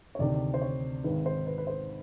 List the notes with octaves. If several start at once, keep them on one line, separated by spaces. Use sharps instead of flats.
C#5
D2 C3 D#3 D5
C5
C#5
G#1 G#2 D#3 B4
C5
B4
B4
C5